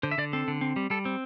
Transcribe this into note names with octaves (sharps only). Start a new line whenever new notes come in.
D3 C5
E5
D3 D5
C4 A4
D3
C4
G3
G3 A4
C4